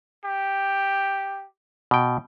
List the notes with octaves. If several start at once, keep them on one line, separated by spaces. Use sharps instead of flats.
G4
B2 G5